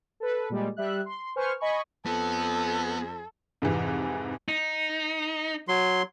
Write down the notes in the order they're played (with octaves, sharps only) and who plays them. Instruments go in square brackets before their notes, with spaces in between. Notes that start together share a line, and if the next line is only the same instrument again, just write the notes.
[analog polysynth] A4 B4
A#2 G3 G#3
G3 E5 F#6
C6
B4 C5 G#5 C#6 F6
D#5 G#5 B5 C#6
[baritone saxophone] F2 [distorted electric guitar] B3 [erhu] A4
[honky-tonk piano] F2 G#2 C3 E3
[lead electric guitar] D#4
[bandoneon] F#3 C6